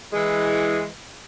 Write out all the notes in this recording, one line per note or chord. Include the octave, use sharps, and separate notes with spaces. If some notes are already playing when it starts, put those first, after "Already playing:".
E3 G#3